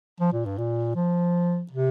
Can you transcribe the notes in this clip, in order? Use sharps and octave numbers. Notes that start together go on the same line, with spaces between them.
F3
A#2
G2
A#2
F3
C3